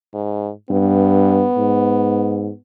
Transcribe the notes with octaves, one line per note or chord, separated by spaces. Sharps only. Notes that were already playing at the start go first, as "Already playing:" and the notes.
G#2
G2 B3
G#2